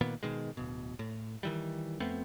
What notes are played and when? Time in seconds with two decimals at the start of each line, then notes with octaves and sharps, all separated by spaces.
0.01 A#2 D#3 A#3 B3
0.23 B2 D#3 G#3
0.57 D1 B2
0.99 A2
1.43 D#3 E3 G3
2.00 F2 A3 B3 C4